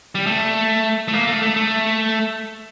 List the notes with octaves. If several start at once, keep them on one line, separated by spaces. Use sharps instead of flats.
G3
A3
A3
A#3
A3
A3
A3